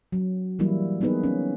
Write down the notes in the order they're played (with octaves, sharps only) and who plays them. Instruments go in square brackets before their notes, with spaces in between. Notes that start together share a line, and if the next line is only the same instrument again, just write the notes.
[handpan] F#3
E3 F#3 G3 A#3 E4
A#3 B3 D#4 G#4 B4
C#4